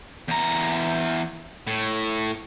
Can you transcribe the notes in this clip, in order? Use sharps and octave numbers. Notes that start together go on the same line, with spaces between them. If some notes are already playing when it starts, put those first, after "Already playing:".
E2 A#5
A2